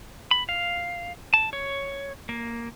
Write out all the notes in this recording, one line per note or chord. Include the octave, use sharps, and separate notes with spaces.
B5
F5
A5
C#5
A#3